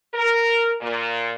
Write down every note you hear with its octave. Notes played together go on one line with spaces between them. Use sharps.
A#4
A#2